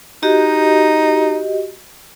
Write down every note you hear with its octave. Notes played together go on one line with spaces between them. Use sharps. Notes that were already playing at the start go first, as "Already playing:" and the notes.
D#4 F#4 G4 D#5